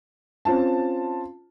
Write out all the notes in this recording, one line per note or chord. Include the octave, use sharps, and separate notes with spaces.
C4 C#4 F4 A5